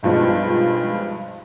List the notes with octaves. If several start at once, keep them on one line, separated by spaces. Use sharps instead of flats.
B1 G2 F3 G#3